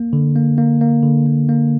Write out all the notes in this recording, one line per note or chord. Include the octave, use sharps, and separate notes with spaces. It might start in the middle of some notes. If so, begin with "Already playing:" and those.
Already playing: A#3
D3
A#3
A#3
A#3
D3
A#3
A#3